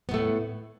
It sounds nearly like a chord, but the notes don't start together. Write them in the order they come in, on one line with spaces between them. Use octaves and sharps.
B3 A2 A3